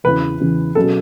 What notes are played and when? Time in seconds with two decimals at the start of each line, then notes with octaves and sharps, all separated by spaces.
0.04 E2 C#3 E3 B4
0.40 E2 C#3 E3
0.75 B2 F#3 C#4 G#4 A4